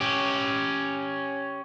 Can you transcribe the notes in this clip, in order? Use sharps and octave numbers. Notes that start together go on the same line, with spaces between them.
C#4 G4